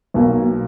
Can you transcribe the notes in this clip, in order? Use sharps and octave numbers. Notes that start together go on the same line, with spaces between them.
B1 B2 A#3